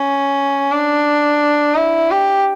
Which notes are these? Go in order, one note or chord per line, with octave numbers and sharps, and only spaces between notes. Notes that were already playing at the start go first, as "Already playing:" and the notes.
Already playing: C#4
D4
E4
G4